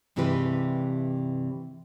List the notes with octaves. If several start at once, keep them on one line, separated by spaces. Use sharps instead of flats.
G2 C3 E3 G#3 G4 B4